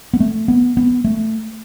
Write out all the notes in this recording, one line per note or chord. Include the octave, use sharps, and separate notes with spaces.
B3
A3
B3
B3
A3